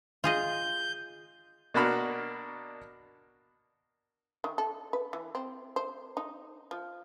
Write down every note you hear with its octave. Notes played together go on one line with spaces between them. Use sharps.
F4 G#4 D#5 G6
B2 A#3 D4 F#4 B5 F6
D#3
A4
B4
E3
C4
C5
D#4
F3